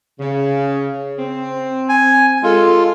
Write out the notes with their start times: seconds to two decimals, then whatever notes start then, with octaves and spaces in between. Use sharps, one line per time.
0.20 C#3
1.19 C4
1.89 G#5
2.43 G#3 F4 A4